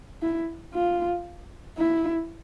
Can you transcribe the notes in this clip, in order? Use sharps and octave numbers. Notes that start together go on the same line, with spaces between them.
E4
F4
E4